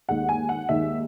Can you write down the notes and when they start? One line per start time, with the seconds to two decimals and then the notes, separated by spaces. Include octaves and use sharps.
0.09 D#2 D#3 G#3 F#5
0.29 G#5
0.49 F#5
0.69 D#2 D#3 G#3 E5